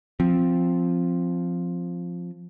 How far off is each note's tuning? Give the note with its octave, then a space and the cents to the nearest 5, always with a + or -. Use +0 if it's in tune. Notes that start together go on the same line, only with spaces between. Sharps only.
F3 +0 C4 +0